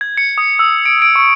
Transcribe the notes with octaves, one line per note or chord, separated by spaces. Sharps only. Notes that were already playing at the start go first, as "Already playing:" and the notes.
G#6
C#7
D#6
E6
D7
D7
C#6